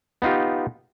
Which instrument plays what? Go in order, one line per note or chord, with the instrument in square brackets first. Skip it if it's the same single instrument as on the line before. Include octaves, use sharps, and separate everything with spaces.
[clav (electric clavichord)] B3 D#4 F4 G4